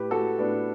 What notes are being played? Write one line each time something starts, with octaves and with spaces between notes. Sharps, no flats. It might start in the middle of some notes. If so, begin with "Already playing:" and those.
Already playing: A2 G4 B4
A2 F#4 A4
A2 B3 D4